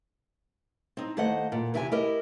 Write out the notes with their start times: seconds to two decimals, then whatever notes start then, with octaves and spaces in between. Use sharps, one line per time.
0.97 C4 D#4
1.17 D#2 A3 C5 D#5 F#5
1.52 A#2
1.74 E2 C3 E4 G4 G#4 G#5
1.92 E4 G4 A#4 D#5